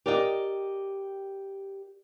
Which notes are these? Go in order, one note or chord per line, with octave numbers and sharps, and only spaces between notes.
G4 A#4 D5 D#5 F5 G5